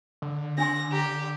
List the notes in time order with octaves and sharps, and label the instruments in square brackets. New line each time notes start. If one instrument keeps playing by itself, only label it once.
[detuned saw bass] D3
[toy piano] D4 G#5 C6 [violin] A#6
[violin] G4 [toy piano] A#5